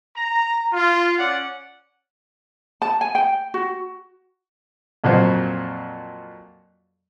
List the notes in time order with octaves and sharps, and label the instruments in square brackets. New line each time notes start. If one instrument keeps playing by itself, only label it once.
[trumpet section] A#5
F4
C#4 D5 F#5
[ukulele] A5
G#5
G5
F#4
[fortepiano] F2 A#2 F#3 C5